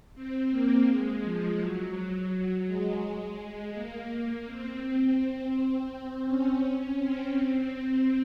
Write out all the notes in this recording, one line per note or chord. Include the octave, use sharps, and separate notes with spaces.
C4
A#3
G#3
F3
F#3
F#3
G#3
A#3
A#3
C4
C4
C4
C#4
C4
C4